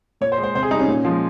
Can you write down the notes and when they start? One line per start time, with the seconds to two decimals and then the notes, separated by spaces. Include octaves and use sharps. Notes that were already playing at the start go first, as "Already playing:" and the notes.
0.21 A#2 C#5
0.32 C5
0.38 G#3
0.43 C5
0.55 C3 C5
0.63 G#4
0.71 G3 D#4
0.79 C#4
0.88 A#2
1.05 F3 G#3